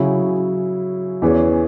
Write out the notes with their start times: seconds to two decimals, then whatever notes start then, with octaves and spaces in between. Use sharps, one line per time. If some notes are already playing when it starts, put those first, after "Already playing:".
Already playing: C#3 F#3 E4 G#4
1.22 E2 E3 C#4 G#4